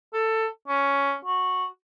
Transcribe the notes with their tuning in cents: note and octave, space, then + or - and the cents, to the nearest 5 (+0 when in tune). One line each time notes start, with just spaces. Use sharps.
A4 +15
C#4 +10
F#4 -10